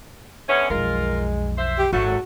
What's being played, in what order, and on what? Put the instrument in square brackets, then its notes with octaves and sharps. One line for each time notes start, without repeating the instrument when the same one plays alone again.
[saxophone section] D3 B3 C#4 [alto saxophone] E5
[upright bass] B1 F2 [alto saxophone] G#3 [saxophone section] F4 A#4
[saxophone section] C5 E5
[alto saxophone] G4
[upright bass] G#1 [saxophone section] F#3 A3 [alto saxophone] F#4